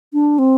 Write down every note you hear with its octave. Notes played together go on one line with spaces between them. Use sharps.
D4
C4